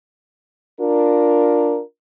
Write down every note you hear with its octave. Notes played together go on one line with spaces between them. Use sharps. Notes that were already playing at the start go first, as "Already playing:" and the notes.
D4 F4 A#4